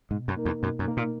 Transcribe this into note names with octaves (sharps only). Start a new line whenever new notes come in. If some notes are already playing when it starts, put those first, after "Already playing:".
G#2 B2
F#2
A#3 D#4 A#4
E2
F#2 B2
F#2
A#3 D#4 A#4
A#2